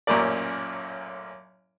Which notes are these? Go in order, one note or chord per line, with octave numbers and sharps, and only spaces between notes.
A1 F#2 A#2 C#4 A#4 D5